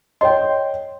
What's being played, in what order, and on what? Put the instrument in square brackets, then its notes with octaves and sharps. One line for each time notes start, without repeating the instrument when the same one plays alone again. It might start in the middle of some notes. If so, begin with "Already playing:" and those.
[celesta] C#5 D#5 [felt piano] G5 C6